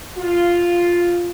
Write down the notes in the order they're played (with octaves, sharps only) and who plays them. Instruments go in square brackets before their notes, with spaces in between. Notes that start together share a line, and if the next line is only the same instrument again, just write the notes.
[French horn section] F4